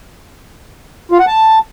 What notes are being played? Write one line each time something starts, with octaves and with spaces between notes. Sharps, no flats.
F4
F#5
A5